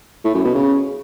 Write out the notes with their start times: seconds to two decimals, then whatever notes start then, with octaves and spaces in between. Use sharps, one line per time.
0.24 A2
0.34 F#2
0.44 B2
0.54 C#3